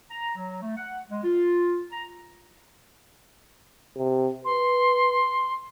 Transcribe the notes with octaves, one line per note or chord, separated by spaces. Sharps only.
A#5
F#3
A3
F#5
G#3
F4
A#5
C3
B4 C6